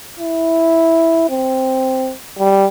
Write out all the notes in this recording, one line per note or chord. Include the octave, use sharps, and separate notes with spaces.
E4
C4
G3